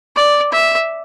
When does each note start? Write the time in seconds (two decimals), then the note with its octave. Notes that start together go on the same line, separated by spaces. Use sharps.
0.16 D5
0.52 E5